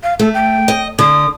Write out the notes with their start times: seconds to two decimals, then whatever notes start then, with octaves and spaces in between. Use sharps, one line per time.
0.03 F5
0.19 A3 A4
0.34 G5
0.68 D#5
0.99 D3 D#6